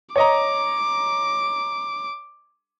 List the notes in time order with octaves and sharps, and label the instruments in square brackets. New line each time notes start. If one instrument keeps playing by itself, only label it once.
[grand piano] C#5 D#5 A#5 [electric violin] D6